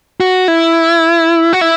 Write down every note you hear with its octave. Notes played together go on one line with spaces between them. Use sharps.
F#4
E4
F#4
E4